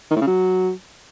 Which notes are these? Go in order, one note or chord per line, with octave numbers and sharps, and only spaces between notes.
D#3
A2
C#3
F#3